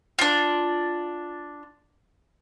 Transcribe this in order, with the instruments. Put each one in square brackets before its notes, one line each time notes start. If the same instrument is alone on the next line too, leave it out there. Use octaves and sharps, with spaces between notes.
[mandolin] D4 F4